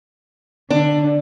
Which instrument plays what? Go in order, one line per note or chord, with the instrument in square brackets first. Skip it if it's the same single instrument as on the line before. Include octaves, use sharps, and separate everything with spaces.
[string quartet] D3 [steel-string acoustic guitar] D4